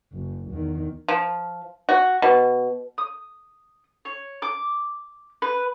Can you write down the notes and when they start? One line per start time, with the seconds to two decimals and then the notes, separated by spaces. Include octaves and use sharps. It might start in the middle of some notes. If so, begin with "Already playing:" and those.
0.13 F#1
0.52 E2 D#3
1.09 F3
1.89 F#4
2.22 B2
2.98 D#6
4.05 C#5
4.42 D6
5.42 B4